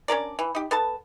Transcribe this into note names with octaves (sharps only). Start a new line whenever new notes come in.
C#4 D4 A#4 D5
E3
D#4 G4
B3 A4 A5